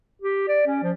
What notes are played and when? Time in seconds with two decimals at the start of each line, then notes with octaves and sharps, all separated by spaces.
0.22 G4
0.48 D5
0.66 C#4
0.83 F3